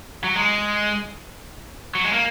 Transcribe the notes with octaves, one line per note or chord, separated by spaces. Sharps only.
F#3
G#3
F#3
G#3
A#3